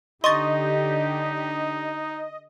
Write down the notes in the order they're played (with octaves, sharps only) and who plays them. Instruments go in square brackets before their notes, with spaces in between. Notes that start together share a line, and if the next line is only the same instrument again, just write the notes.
[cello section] D3 G4 [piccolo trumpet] D#4 [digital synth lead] D#5 [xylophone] C6 C#6 A6